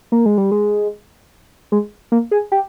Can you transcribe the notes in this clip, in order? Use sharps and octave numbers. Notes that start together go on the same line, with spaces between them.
A#3
G#3
G3
G#3
G#3
A#3
G#4
G4